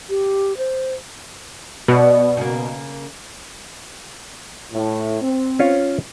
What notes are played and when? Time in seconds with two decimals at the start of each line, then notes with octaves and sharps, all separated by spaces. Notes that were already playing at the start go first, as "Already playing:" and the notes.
0.09 G4
0.58 C5
1.88 B2 B3 D5
2.37 C#3 A#3
4.72 A2
5.21 C4
5.59 C#4 F4 C#5